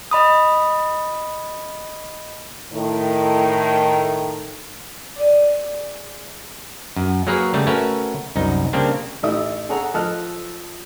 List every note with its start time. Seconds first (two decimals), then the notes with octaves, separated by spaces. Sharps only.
0.11 D#5 B5 D#6
2.73 A2 D#3
5.16 G#4 D5
6.96 F#2
7.27 F#3 A#3 G#4 A#4 B4 C#5
7.54 C#3 G3 A3
7.67 A3 C#4 F#4 A#4 B4
8.36 C2 F#2 D#4
8.73 C#3 G3 A#3 C4 D4
9.23 A1 A3 D#4 E4 E5 D#6
9.69 G#4 A4 C#5 F#5 A#5
9.94 F3 A4 D#5 A5 F6 F#6